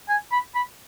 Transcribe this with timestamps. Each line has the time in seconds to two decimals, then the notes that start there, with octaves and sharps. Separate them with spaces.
0.09 G#5
0.32 B5
0.55 B5